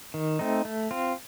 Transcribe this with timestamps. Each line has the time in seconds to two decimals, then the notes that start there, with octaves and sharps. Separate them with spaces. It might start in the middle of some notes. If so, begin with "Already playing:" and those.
0.14 D#3
0.39 A3 C4 D#4
0.65 A3
0.91 C4 F4